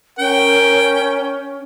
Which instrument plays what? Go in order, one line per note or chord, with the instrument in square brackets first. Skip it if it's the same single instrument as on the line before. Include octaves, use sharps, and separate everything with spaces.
[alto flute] C#4 [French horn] A#4 [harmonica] G5